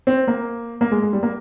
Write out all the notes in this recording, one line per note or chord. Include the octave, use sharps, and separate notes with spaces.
C4
A#3
A#3
G#3
G#3
G3
A#3